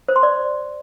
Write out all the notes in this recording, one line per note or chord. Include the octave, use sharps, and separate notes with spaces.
C5
C6
D5